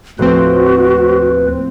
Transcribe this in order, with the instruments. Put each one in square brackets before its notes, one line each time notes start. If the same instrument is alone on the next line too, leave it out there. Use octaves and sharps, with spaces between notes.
[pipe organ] D#2 B4 [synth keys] A2 F3 C4 [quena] F#4